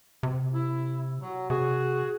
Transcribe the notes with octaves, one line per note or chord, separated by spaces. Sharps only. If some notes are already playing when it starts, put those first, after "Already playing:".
C3
E4
F#3
C3 F#4 G#4